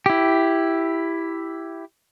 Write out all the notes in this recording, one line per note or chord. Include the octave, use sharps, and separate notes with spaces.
E4 G4